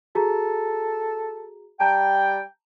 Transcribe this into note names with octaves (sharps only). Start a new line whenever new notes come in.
F#4 G#4 A4 A#5
G3 G5 A5 A#5